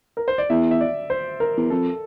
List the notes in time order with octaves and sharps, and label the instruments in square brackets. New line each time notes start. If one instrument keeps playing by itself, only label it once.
[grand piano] A#4
C5
D5
[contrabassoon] E2 [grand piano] E5
[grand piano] E5
D5
C5
A#4
[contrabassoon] E2
[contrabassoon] F2 [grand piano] A4